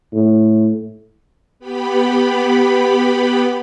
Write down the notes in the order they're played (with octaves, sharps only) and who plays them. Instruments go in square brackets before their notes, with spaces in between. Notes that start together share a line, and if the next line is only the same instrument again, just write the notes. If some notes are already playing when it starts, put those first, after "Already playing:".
[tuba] A2
[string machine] B3 G4 B5